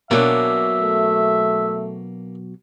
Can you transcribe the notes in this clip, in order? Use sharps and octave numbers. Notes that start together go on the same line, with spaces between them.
B2 F#3 A#3 C#4 D4 E5
A3